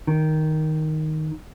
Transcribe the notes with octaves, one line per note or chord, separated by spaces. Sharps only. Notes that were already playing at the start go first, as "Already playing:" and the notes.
D#3